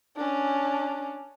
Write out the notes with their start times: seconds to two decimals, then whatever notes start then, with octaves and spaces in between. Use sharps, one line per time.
0.17 C#4 D4